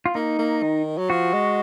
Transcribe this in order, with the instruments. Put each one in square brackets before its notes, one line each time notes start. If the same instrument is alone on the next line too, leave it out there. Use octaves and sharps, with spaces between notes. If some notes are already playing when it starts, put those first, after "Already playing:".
[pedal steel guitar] F4
[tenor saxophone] A#3 [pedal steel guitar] D#4
[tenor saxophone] A#3
D#3
F#3
[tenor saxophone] F3 [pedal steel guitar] F#4
[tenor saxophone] G#3